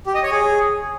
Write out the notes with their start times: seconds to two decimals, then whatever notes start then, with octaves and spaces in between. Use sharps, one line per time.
0.06 G4
0.15 D#5
0.23 C#5
0.31 G#4